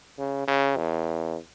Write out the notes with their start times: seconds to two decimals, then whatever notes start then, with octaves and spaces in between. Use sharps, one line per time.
0.18 C#3
0.47 C#3
0.77 E2